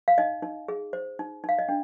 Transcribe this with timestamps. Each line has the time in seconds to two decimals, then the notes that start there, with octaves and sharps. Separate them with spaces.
0.08 F5
0.18 D#4 D#5
0.43 D#4
0.68 G#4
0.93 C5
1.19 D#4
1.44 D#4 F5
1.59 D#5
1.69 D4